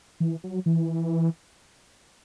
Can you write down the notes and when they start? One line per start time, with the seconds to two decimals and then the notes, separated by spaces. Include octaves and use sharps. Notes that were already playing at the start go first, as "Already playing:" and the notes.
0.20 E3
0.44 F#3
0.66 E3